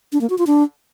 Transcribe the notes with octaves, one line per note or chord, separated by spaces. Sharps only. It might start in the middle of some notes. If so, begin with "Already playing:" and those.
D4
A#3
F#4
F4
D4